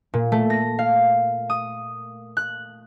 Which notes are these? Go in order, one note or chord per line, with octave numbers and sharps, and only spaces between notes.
A#2
A3
A#6
F5
D#6
F#6